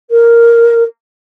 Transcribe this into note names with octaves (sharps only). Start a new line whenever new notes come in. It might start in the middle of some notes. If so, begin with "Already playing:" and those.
A#4